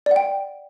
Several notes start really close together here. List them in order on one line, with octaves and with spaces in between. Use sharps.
D5 F#5 G5